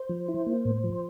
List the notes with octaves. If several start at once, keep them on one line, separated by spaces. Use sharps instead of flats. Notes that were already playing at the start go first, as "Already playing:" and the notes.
Already playing: C5
F3
E4
A#3
A2
F3